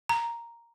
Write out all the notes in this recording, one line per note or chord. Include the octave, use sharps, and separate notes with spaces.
A#5